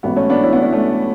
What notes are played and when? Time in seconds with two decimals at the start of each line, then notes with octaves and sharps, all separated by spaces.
0.03 A1 G#2 F#3 B3
0.16 A3 C#4
0.30 B3 D4
0.43 C#4 E4
0.52 B3 D4
0.62 C#4 E4
0.72 A3 C#4